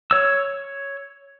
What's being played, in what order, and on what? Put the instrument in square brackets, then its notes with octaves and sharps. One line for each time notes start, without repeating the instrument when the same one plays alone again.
[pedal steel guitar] C#5 E6